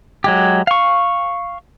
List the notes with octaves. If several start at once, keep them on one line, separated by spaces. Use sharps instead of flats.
F#3 G#3 G4
F5 C#6